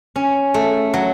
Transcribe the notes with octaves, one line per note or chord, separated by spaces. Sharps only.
C#4
A3
F#3